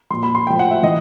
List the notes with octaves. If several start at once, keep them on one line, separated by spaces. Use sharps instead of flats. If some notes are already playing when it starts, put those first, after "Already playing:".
A#2 F3 C6
B5
C6
A2 F3 G5
F#5
E5
E3 D#5